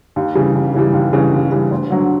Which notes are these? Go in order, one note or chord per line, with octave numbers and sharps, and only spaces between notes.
D#2
C#3 E3 G3
D#2
C#3 E3 G3
D#2
C#3 E3 G3
D#2
C#3 E3 G3
D2
D3 F#3